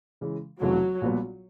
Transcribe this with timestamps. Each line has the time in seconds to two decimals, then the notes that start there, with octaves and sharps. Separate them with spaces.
0.21 C#3 E3 G#3
0.62 F1 F2 C#3 E3 F#3 A3
1.01 A#1 A#2 G3 B3